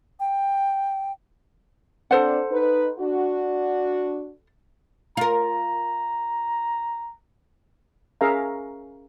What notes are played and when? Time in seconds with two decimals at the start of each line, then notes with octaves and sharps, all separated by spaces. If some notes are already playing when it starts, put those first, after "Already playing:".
0.20 G5
2.11 C4 D4 A4 C5 F#5
2.51 D#4 B4
2.99 D4 F#4
5.17 F4 A#4 A#5
8.21 C#4 G#4 A#4 E5 F5 A#5